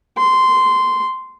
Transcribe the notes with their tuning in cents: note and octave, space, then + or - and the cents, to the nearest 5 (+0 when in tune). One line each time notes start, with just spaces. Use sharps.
C6 -10